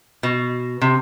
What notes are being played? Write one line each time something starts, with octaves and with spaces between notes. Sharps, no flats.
B2
C3